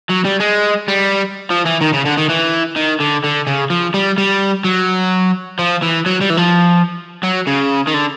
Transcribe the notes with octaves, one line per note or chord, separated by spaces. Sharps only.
F#3
G3
G#3
G3
F3
E3
D#3
C#3
D3
D#3
E3
D#3
D3
D3
C#3
F3
G3
G3
F#3
F3
E3
F#3
G3
E3
F3
F#3
C#3
D#3
D3